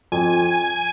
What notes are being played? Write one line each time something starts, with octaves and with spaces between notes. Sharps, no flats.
F2 G#5